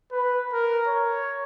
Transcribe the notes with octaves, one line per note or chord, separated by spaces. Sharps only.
B4
A#4
C#5